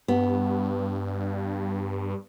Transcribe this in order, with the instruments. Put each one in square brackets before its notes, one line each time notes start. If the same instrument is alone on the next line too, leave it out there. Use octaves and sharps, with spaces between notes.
[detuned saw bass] G2 [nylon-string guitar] B3